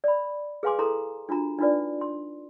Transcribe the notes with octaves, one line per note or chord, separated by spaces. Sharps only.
D5 B5
G#4 B4 F5 G#5 C6 D6
E4 G#4 A4 A#5 C6
D4 F4 F#4 A#5
D4 D#4 F4 B4 D5
C6